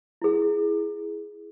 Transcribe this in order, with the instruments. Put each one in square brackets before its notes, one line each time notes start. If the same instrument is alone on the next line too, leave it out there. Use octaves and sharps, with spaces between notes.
[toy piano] E4 G#4